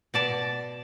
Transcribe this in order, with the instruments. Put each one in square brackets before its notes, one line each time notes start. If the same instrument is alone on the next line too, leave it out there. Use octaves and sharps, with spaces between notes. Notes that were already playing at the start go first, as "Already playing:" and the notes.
[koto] B2 D5 A5